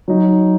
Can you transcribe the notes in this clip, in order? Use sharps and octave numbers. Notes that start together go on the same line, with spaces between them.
F#3 D#4